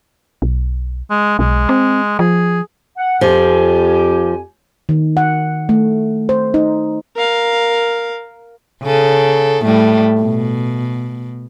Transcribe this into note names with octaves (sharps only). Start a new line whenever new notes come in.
B1
G#3
B1 G#3
C4
F3 G#4
F#5
F2 F3 G4 G#5
D#3
F#5
A3
C5
D#4
A#4 F5
C#3 A4
A2 G3 A3
B2